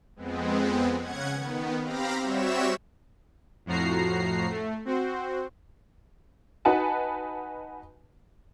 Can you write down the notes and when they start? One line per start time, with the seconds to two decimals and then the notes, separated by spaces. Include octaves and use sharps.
0.16 F2 G#3 B3 C4
0.99 C#3 C#4 F#5 G#6
1.34 D#3 B3
1.82 C4 G4 F5 A#5 B5 A#6
2.20 G3 C4 F#4 C#5 E5 E7
3.66 F2 A2 F3 F#4 A#5 C7
4.50 A3
4.85 C4 F#4 C5
6.65 D#4 F#4 B4 F#5 G#5 A5